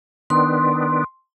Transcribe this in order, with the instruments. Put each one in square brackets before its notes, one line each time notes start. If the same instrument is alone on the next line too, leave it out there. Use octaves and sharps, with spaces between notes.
[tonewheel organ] D#3 B3 D4 [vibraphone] C6